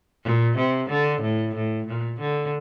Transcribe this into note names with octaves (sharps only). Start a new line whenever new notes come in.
A#2
C3
D3
A2
A2
A#2
D3